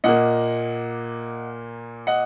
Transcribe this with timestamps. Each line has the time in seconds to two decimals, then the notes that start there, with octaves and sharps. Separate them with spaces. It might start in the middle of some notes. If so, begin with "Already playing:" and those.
0.04 A#2 A#3 D#5 F#5
2.07 D#5 F#5